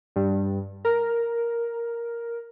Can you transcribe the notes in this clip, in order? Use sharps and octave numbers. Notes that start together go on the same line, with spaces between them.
G2
A#4